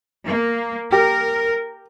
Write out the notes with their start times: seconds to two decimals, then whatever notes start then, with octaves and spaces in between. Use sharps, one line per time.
0.23 A#3
0.92 G4 A#4